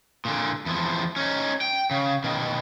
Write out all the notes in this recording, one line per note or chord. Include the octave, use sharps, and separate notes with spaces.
A#2 D3
E2 F3
C#4 D#4
G5
C#3
B2 D#3